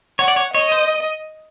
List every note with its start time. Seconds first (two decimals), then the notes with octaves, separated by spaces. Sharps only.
0.19 C#5 F#5
0.28 D5
0.36 C#5
0.54 C#5 D#5
0.72 C5